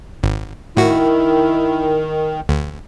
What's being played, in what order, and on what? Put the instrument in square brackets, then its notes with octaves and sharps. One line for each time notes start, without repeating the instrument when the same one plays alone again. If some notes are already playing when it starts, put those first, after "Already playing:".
[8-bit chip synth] G#1
[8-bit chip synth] A2 F#4 [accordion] D#3 [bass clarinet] E4
[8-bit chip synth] D2